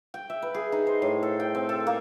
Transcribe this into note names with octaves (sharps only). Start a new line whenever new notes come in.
G5
E5
B4
G#4
D#4
C5
A2
A4
G5
C4
A4
A#3